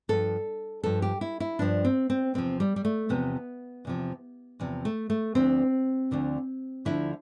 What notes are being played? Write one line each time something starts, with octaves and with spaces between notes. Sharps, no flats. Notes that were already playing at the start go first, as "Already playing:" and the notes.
G2 F3 A4
G2 F3 A4
G4
E4
E4
G2 F3 D4
C4
C4
E2 C3 F3 C4
G3
G3
A3
E2 C3 F3 B3
E2 C3 F3
E2 C3 F3
A3
A3
D2 D3 F3 C4
D2 D3 F3
D2 D3 F3 E4